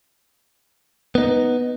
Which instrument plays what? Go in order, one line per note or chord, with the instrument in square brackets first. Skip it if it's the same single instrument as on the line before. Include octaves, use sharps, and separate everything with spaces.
[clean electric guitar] B3 D#4